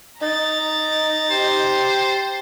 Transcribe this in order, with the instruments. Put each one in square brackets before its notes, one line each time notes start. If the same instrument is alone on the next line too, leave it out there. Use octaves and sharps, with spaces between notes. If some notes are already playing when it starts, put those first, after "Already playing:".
[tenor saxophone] D#4 [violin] A#5 A6
[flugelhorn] G4 [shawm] C5